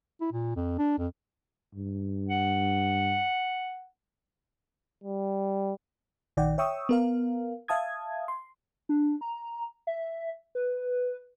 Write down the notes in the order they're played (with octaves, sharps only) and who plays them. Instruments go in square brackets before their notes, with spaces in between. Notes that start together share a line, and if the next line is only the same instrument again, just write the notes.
[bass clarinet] E4
A#2
F2
D4
F2
[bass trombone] G2
[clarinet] F#5
[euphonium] G3
[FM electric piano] A#1 D#3 D5 F#5 G5
C#5 E5 G5 C#6 D#6 E6
B3 A#4 F5
E5 F5 A5 D#6 G#6
C6
[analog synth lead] D4
A#5
E5
B4